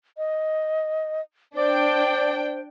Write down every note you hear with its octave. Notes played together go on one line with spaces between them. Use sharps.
D#5
D4 C5 D5 G5